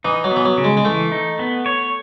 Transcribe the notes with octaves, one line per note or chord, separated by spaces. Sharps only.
E3 D#4
F#3
B3
E3
F#3
C#3
G#3
G#3
E3 A3
D#4
B3
C#5